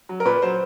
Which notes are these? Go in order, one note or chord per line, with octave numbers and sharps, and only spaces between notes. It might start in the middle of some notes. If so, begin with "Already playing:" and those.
F#3
A#4
A#2 B4
F#3 C5